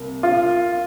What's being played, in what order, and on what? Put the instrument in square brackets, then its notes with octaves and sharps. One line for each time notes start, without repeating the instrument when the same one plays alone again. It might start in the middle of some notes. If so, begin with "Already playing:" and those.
Already playing: [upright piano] C2 C3 A#3
[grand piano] F4